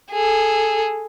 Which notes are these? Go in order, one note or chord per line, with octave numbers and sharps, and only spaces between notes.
G#4 A4